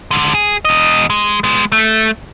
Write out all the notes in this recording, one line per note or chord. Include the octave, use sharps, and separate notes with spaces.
D3 G#3
G#4
E2 D#5
G#3
G#3 B3
A3